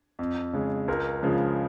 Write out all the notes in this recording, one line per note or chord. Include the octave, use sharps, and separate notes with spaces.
F2
C#3 G#3
C#2 F4 A#4
C#3 F3 G#3